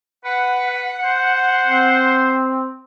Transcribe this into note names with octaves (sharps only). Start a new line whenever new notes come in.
B4 F#5
C5
C4